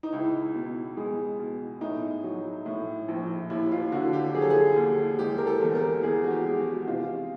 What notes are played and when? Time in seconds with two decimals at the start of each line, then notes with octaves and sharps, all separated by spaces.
0.03 D#4
0.13 C#2 E4
0.55 B2
0.97 G#3
1.39 B2
1.81 A2 D#4
2.24 F#3
2.66 A2
3.08 A#1
3.50 D#2 E4
3.72 F4
3.92 D3 F#4
4.13 G4
4.34 F#3 G#4
4.42 A4
4.50 G#4
4.76 D#2
5.19 G#3 G4
5.38 A#4
5.47 A4
5.61 E2
5.75 A#4
6.03 E2 G#4
6.24 F#4
6.31 G4
6.45 G#3
6.59 F#4
6.88 C3 F4